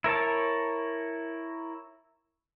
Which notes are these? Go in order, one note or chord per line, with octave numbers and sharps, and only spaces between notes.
E4 A#4 C#5 A5